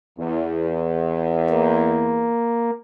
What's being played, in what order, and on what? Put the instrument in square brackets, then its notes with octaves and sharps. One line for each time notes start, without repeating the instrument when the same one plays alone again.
[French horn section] E2
[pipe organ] A#3